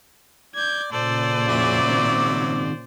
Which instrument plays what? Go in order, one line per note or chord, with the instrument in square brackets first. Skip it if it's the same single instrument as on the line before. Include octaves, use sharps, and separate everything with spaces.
[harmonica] D5 [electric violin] G6 G#6
[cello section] A#2 C#3 [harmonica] A4 [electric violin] C5 D5
[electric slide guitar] F2 G#4 [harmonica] F#3 E5 D6
[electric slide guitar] D#3 C4